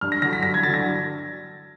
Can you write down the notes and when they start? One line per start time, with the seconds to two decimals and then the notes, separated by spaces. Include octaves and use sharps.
0.01 G2 F6
0.12 A#6
0.22 D3 F#3 A#6
0.33 B6
0.43 G2 A#6
0.54 G#6
0.63 D3 F#3 A6
0.74 A#6